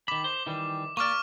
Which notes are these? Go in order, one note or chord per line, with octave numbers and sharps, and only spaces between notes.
D#3 B5 D6
C5
D#3 E3 G3
A#3 D5 C#6 D6 F6